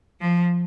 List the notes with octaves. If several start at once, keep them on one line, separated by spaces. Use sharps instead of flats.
F3